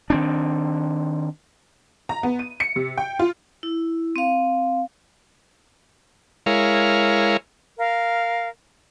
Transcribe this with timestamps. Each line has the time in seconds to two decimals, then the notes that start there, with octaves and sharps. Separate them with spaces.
0.10 D#3 C4 D4
2.09 A#5
2.23 B3
2.39 D#7
2.60 C#7
2.76 C3
2.97 G5
3.19 F4
3.63 E4
4.16 C4 F5
6.46 G#3 E4 A#4 C#5 F5
7.77 A#4 F5